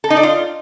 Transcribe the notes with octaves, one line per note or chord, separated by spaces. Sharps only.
A4
D#4
D5
F4